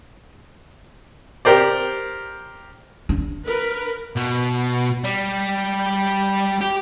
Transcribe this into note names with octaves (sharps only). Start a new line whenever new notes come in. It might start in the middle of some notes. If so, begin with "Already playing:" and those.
G4 A#4 C5 D5
D4
A#4 B4
B2
G3
G4